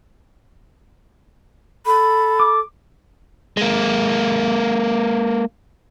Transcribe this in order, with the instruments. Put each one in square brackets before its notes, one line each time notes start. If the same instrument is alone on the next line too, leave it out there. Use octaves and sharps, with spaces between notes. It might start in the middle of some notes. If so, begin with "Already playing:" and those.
[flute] A4 [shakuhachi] B5
[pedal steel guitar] D6
[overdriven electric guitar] G#3 A#3